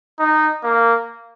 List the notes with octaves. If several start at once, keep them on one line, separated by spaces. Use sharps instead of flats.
D#4
A#3